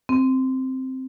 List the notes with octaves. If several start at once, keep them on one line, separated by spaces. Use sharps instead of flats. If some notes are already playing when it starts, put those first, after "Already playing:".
C4